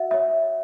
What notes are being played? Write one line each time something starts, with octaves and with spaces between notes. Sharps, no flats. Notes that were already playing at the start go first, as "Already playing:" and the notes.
Already playing: F#4 E5 F#5
C#5 E5